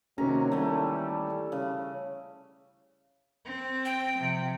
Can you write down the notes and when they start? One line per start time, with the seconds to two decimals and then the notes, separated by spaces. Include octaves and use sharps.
0.18 C3 D#3 F#3 A#3 C#4 A#5
0.52 E3 G3 A3
1.52 C#3
3.45 C4
3.85 G5
4.18 C3 F3